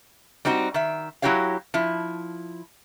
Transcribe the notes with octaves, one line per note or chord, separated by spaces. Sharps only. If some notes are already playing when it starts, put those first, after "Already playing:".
G3 C4 D#4 F#4
D#3 E5
F#3 E4 F#4 G4 C#5 F5
F3 E4